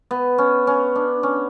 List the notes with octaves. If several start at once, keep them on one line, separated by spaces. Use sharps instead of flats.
B3
C#4
C#4
D4
C#4